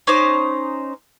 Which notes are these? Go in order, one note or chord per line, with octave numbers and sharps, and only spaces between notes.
C#4 D#4 C5 D6